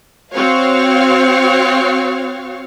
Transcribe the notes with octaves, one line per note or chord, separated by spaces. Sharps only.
C4 F#4 C#5 F5